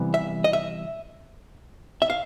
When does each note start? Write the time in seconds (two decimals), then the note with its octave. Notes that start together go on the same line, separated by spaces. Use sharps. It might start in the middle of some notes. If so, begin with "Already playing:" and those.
Already playing: C3 E3 G3 B3
0.14 E5
0.44 D#5
0.53 E5
2.02 E5
2.10 F5